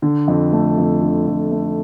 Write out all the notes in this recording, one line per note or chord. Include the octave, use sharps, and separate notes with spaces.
D3
F2
A3
F2
D3
F2
A3